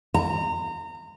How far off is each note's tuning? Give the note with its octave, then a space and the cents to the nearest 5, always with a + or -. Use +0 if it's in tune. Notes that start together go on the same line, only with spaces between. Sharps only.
A#5 -25